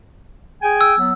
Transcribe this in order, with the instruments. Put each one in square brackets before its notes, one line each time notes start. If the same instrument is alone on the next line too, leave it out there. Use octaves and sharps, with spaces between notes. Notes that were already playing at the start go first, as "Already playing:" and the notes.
[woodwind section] G#4 G5 G#5
[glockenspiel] E6
[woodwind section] F#3 B3